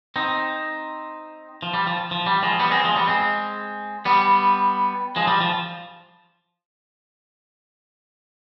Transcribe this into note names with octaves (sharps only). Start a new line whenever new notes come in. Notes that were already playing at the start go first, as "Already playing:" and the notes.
C4 D#4
F3
G3
F3
F3
G3
F3 G#3
G3 B3
G#3 C4
F3 G#3
G3 B3
G#3 C4
G3 B3
F3 G#3
G3
F3